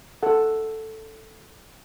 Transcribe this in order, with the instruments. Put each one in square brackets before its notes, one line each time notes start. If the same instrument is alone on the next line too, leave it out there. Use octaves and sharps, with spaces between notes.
[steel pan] A4 F#5